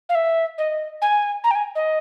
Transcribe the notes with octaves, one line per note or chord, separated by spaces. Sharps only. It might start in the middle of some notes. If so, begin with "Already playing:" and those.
F5
E5
D#5
G#5
A#5
G5
G#5
D#5